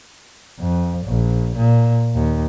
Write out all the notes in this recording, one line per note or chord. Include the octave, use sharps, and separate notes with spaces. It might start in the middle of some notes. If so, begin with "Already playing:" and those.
F2
A#1
A#2
D#2